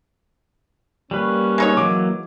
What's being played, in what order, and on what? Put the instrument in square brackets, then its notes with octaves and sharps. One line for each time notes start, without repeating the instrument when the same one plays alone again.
[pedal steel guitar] G3 A#3 B4 [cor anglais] C#4
[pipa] G#3 D#4 C#5
[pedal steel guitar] E3 F#3 A#3 [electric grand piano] D6